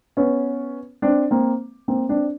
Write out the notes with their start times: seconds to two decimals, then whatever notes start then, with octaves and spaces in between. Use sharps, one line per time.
0.17 B3 C#4
1.02 C4 D4
1.31 A#3 C4
1.88 A#3 C4
2.09 C4 D4